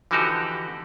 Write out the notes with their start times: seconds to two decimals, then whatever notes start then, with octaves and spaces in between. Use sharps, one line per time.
0.11 D3 E3 F3 D#4 F#4 G4